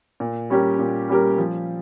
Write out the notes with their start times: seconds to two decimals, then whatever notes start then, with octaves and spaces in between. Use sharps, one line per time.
0.20 A#2
0.50 G3 C#4 G4 A#4
0.79 A#2
1.09 G3 C#4 G4 A#4
1.38 F3